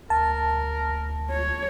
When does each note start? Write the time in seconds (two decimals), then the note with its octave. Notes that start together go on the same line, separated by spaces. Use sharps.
0.10 D2 A#4 A5
1.30 C#5